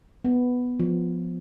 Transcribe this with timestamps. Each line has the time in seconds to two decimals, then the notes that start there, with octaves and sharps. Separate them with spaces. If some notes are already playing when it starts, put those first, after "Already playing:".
0.25 B3
0.80 F3